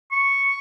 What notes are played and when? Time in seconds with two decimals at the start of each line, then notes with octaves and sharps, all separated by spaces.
0.11 C#6